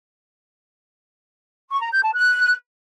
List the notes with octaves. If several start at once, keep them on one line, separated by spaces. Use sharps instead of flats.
C#6
A#5
G6
A5
F#6